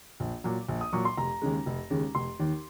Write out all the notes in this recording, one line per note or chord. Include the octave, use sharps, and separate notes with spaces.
A#1
A#2 F#3
A#1
D#6
A#2 F#3 C#6
C6
F1 A#5
D#2 C#3 G#3
F1
D#2 C#3 G#3
F1 C6
D#2 D#3